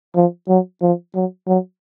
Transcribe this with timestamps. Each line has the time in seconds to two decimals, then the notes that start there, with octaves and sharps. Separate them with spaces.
0.15 F3
0.48 F#3
0.82 F3
1.15 F#3
1.47 F#3